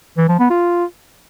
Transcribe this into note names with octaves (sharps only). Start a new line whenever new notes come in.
E3
F3
B3
F4